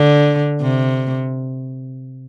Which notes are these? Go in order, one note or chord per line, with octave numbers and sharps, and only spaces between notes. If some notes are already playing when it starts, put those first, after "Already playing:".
Already playing: D3
C3